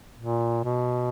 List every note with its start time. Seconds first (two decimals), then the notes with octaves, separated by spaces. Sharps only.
0.18 A#2
0.64 B2